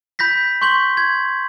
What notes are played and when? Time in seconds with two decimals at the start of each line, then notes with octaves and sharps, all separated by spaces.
0.19 B5 G6 A#6 B6
0.62 C6 C#6 G6 B6 F#7
0.97 G#6